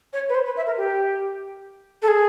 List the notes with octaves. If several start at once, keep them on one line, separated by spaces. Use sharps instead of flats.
C#5
B4
C5
B4
E5
A#4
G4
A4
G#4